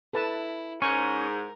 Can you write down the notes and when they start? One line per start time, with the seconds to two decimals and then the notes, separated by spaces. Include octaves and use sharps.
0.13 E4 A4 B4 A5
0.82 G#2 C#4 A#4 C#6